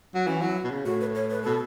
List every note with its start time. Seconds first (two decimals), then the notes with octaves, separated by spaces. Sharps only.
0.14 F#3
0.26 E3 C#4
0.41 F#3 E4
0.64 B2
0.70 C#3
0.85 A2 F#4
1.01 B4
1.15 C#5
1.31 B4
1.42 B2 A4